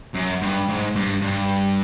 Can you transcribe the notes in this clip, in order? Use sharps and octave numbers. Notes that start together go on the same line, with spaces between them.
F#2
G2
G#2
G2
G2